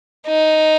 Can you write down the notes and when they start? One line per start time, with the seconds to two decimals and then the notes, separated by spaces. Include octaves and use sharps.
0.27 D#4